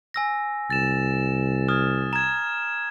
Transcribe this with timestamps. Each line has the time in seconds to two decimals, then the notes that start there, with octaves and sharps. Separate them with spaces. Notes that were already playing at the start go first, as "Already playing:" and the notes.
0.14 G#5 E6 A#6
0.70 C2 A6 E7
1.69 D#6 F6 G#6
2.13 A#5 G#6 E7